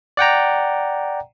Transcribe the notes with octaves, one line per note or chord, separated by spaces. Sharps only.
D5 F#5 G5 A#5